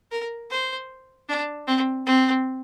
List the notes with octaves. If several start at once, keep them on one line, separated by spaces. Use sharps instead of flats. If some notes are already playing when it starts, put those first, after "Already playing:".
A#4
C5
D4
C4
C4